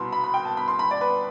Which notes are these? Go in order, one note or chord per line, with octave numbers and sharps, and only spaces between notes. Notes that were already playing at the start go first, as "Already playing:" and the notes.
Already playing: C2 B2 B3 B5 C6
B5
B5
G5
A5
B5
C6
B5
D5
B4